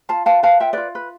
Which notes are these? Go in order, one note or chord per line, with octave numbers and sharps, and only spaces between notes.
F4 F5 A5
B4 F5 A5
B4 F5 A5
F4 E5 G5
F4 B4 D5
B4